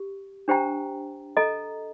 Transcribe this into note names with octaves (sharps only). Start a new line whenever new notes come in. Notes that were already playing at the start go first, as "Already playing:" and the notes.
Already playing: G4
D4 G4 C5 G5 A#5
A4 D#5 A#5